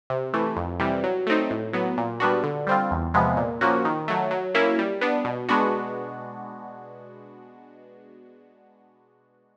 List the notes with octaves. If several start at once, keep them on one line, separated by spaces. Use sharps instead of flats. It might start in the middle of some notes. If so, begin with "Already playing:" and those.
C3
E3 A3
F2
C3 E3 G3
F#3
A3 C4 D#4
A2
F#3 B3
A#2
G3 B3 D4 F#4
D3
G3 C4 F4
E2
C3 F3 G#3 B3
A#2
F3 A#3 C#4 F#4
D#3
F#3 A3
F#3
A#3 C#4 E4
G3
B3 D4
B2
G#3 B3 D4 F#4